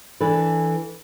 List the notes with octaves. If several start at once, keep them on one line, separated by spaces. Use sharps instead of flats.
E3 D4 A4 B4